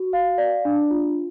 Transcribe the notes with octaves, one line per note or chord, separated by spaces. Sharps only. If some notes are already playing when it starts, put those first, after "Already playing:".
Already playing: F#4
F5
D5
D4
F4